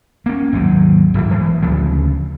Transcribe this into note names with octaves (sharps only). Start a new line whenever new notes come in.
A#3 C#4
G#1 D#2 C3 F#3
D#1 G#1 D#2
E3 G#3 A#3
D2 C#3 F3